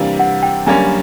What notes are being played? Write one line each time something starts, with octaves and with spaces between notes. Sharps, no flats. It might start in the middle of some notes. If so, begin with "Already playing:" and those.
Already playing: C3 E3 G3 A#3 D4 F5
F#5
G5
F#2 D3 G3 A#3 C#4 G#5